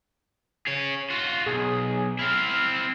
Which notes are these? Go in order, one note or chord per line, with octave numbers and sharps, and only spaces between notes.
G#4 C#5
F4 F#4
B1 G#4
C4 E4 F6